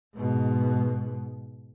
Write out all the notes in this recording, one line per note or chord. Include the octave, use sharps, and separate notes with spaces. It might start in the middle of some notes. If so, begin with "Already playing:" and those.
G#2 B2